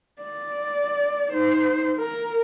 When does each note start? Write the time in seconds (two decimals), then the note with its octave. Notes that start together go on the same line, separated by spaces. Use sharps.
0.22 D5
1.31 D#4 C5
1.98 A#4